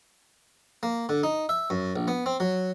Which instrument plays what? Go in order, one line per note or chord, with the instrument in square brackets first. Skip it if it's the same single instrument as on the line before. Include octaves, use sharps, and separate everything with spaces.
[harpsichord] A#3
D3
D#4
E5
F#2
A#1
B3
C4
F#3